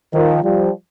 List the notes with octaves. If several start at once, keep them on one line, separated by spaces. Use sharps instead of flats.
D#3 F3
F3 G3